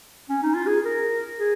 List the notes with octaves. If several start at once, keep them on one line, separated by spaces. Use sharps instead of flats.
C#4
D#4
F4
G#4
A#4
G#4